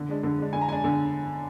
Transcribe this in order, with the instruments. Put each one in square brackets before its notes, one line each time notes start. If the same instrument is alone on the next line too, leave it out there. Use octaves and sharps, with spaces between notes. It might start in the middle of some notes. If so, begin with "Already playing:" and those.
Already playing: [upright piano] D3
G#3 D4
D3
G#3 D4
D3 G#5
A#5
G#3 D4 G#5
D3